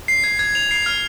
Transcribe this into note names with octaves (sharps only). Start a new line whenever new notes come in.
C7
G#6
G#6
F7
C7
F6